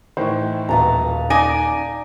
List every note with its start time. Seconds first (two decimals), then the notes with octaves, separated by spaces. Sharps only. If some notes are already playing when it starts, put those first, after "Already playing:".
0.17 A2 D#3 E3 C5 C#6
0.69 D#1 F#4 B4 F5 A5 A#5
1.30 D#4 D5 G#5 A#6